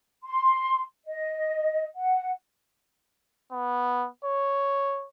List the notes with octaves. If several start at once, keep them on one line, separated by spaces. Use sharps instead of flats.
C6
D#5
F#5
B3
C#5